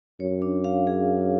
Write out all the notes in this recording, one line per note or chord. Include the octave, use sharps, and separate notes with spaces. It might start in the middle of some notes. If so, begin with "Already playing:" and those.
F#2 C#5
D4
F5
G#4